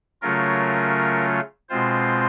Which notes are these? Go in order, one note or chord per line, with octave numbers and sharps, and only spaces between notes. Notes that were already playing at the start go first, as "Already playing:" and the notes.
C#3 F#3 A3 C#4 F4 A#4
B2 G#3 C4 F4 C5